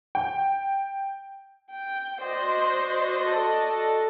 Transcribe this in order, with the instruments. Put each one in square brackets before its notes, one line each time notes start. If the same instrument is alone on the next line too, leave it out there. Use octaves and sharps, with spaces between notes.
[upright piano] G5
[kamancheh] G5
[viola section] F#4 D5 D#5 [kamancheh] C5
[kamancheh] A4 A5
A4